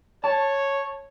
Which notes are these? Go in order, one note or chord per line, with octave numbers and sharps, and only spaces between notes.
C#5 A5